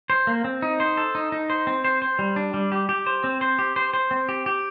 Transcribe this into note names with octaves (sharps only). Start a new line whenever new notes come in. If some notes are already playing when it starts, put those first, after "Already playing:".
C5
A#3
C4
D#4
C5
A4
D#4
D#4
C5
C4
C5
C5
G3
D4
G3
G4
G4
C5
C4
C5
G4
C5
C5
C4
G4
G4